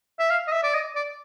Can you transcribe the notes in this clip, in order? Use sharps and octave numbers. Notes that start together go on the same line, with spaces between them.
E5
F5
D#5
E5
D5
D#5
D5